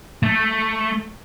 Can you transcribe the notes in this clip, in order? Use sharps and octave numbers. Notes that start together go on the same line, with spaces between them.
A3